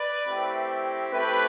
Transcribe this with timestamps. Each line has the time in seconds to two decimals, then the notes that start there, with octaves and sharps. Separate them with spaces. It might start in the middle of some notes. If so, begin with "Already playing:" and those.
Already playing: B4 D5
0.26 A3 C4 E4 G4
1.13 A3 C4 E4 G4 B4